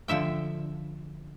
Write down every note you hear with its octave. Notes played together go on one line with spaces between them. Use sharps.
D3 F3 E5 G5